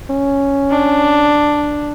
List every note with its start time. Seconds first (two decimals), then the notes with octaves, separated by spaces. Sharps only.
0.10 C#4
0.71 D4